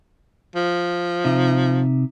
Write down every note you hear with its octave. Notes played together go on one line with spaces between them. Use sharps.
F3
C3 D#4 E5